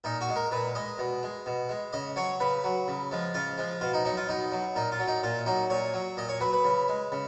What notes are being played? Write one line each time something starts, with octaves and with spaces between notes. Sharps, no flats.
A#2 D#4
F#4
G#3
A#4
A#2 B4
G#3 D#5
B2
G#3
B2
G#3
C#3 D#5
F#3 C#5
C#3 B4
F#3
C#3
F3 G#3
C#3 F4
F3 G#3
B2 F4
D#4
F#3 D#4
F4
B2 D#4
F#3
A#2 D#4
F4
F#3
D#4
A#2 F4
F#3 D#4
A#2 C#5
F#3
A#2 D#5
C#5
F#3 B4
B4
C#3
G#3
C#3